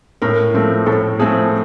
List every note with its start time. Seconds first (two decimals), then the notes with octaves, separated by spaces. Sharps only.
0.22 A2 A#4
0.54 F3 A3 C4
0.86 A2 A4
1.19 F3 A3 C4 G#4